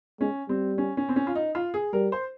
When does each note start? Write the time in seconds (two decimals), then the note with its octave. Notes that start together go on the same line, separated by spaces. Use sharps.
0.20 G#3 C#4
0.49 G3 C4
0.78 C#4
0.97 C#4
1.09 C4
1.16 C#4
1.27 F4
1.35 D#4
1.55 F4
1.74 G#4
1.93 G3 A#4
2.12 C5